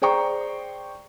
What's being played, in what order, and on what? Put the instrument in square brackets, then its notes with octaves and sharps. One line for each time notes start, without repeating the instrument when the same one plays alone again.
[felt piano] G#4 C5 D5 G5 A#5 C#6